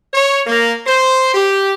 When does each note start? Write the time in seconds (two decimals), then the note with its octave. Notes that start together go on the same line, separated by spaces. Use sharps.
0.14 C#5
0.47 A#3
0.87 C5
1.34 G4